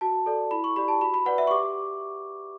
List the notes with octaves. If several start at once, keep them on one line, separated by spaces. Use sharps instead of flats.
F#4 A5
A4 D5
E4 B5
C#6
G4 D5 B5
A5
F#4 B5
B5
B4 D5 F#5
E5
C#6
G4 D6